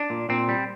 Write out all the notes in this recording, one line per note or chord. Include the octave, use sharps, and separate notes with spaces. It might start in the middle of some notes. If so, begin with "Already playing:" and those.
Already playing: D4
A#2
A#2 C4
G3